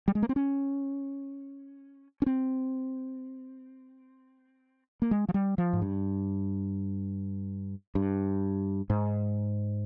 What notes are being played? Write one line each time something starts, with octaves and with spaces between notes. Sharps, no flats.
G3
G#3
A#3
C4
C#4
C#4
C4
A#3
G#3
F3
G3
F3
G#2
G2
G2
G#2